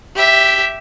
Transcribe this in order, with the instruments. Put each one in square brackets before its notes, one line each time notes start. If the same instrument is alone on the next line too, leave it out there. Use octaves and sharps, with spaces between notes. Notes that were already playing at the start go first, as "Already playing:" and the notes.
[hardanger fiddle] G4 E5